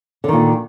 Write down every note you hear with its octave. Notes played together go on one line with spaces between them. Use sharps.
A#2 D3 D#3